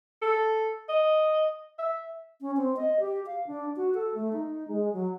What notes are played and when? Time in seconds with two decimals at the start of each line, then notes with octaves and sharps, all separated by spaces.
0.22 A4
0.89 D#5
1.79 E5
2.41 C#4
2.57 C4
2.77 D#5
3.00 G4
3.27 F5
3.47 D4
3.76 F#4
3.95 A4
4.15 A3
4.33 D#4
4.68 G#3
4.93 F#3